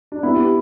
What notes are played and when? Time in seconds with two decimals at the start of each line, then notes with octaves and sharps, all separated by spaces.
0.12 D4
0.23 B3 E4
0.35 G4